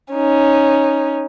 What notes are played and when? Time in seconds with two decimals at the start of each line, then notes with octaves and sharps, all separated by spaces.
0.14 C#4 D#4